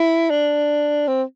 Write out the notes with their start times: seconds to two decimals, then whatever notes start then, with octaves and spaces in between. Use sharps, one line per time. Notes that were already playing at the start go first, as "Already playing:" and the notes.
Already playing: E4
0.30 D4
1.08 C4